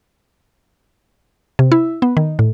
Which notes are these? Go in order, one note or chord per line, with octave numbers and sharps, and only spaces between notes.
C3
E4
B3
D#3
A2